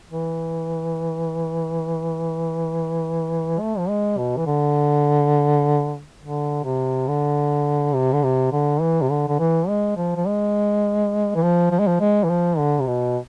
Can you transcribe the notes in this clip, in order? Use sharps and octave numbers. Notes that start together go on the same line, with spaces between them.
E3
A3
F3
G#3
B2
E3
D3
D3
C3
D3
C3
D3
C3
D3
E3
C3
D3
D3
E3
G#3
F3
F3
G#3
E3
F3
F3
G#3
F3
G#3
E3
F3
D3
C3
B2